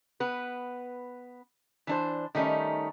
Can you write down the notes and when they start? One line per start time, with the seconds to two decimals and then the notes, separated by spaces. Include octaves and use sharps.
0.20 B3 B4
1.87 E3 D4 C5
2.35 D#3 G3 A3 C#4 D#4